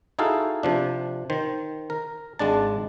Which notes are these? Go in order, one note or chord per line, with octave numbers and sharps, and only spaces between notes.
D#4 E4 F#4 G#4 A4 F5
C3 F3 D4
D#3 C5
A#4
G#1 G#3 D4 A5